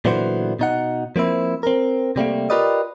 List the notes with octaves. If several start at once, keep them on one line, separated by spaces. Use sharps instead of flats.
A#2 D3 E3 F#3 B3 C5
B2 D#4 F#5
F3 A#3 C4 E4
C4 A#4
C3 G3 A3 A#3
F4 G4 A#4 B4 D5 D#5